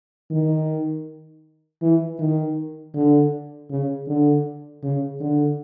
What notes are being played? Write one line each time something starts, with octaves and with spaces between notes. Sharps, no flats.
D#3
E3
D#3
D3
C#3
D3
C#3
D3